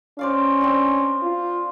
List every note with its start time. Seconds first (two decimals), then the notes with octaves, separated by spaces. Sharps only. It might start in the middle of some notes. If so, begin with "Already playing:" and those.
0.19 C#4 C5 D5 F5
0.61 C4 D4
1.23 F4